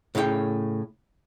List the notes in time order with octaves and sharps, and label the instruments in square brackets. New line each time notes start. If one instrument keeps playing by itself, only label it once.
[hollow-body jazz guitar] A2 C#3 C#5 F5 G5